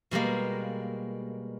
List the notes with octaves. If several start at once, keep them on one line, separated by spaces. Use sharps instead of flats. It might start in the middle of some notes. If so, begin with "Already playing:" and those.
B2 G3 G#3 A#3